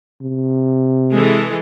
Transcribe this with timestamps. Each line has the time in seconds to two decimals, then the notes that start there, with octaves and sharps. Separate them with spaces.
0.22 C3
1.11 E3 G#3 A4